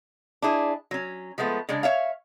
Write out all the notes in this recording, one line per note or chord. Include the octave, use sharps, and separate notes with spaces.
D4 E4 G#4
F#3 C#4
F3 G#3 A3 B3
C#3 G#3 D4
C#5 E5 F5